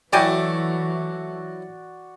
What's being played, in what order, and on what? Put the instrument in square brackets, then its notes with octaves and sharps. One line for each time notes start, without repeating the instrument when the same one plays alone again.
[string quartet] E3 [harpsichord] F#3 E4 [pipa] A3 G5 G#5 [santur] F#4 D5